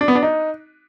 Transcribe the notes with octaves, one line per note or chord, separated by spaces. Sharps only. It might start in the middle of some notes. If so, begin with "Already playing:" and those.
D4
B3
D4
D#4